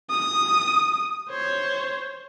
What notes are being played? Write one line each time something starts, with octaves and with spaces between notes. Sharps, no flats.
D#6
C5 C#5